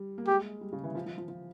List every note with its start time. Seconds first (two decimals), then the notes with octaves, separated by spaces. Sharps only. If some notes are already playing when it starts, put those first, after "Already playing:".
Already playing: G3
0.18 A#3
0.27 G#3 G4
0.61 G3
0.73 C#3
0.84 E3
0.95 F3
1.06 F3
1.18 F3
1.28 F3